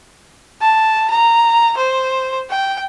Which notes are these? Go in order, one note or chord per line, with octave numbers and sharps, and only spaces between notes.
A5
A#5
C5
G5